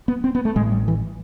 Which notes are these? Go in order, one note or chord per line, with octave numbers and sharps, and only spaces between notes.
B3
C4
B3
A3
A1 A2 G#3
G3
E3